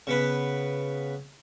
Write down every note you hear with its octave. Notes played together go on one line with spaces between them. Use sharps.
C#3 B3 B4